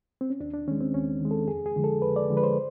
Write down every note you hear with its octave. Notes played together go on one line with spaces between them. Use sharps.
C4
C#4
D#2 D4
D4
D#3 G#3 C#4
C4
D#2 C#4
D#3 G#3
A4
F2 G#4
G#4
D3 F3 G#3
A4
F2 B4
D5
D3 F3 G#3
B4
C5